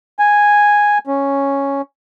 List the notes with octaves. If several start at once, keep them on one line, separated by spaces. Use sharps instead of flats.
G#5
C#4